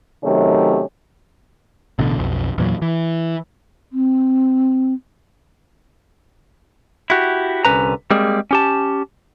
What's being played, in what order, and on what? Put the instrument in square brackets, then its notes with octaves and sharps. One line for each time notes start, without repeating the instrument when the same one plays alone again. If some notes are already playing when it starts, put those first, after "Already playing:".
[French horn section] C3 D#3 F#3 A3 C#4 G4
[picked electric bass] A1 B2 D3
B1 F2
E2 A#2 F#3
E3
[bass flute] C4
[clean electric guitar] E4 F#4 G4
C2 D3 E3 C#4 B4 A#5
G3 G#3 A#3 C4 G#4
C#4 G4 A5